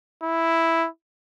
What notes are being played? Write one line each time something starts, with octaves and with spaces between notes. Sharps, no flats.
E4